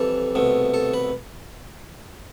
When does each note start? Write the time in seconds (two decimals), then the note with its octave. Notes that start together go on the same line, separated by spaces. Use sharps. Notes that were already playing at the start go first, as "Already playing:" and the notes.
Already playing: F2 E3 G3 A4
0.35 C2 B2 A3
0.74 A4
0.94 B4